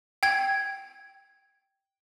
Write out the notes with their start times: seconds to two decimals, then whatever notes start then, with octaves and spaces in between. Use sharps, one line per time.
0.23 G5 G#6